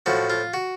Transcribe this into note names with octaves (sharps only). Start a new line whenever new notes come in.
A2 F3 F#4
F4
F#4